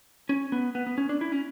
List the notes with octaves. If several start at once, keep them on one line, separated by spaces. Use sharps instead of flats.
C#4
B3
B3
B3
C#4
D4
E4
C#4